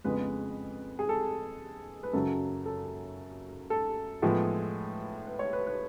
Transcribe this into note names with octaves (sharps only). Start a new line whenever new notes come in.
F2 C#3 G#3 B3 B4
G#4
A4
B4
F#2 C#3 F#3 A4
A4
A4
A2 F3 G#3 B3
B4
C#5
B4
B4